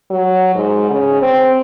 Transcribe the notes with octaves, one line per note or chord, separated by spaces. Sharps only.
F#3
G#2
C#3
C4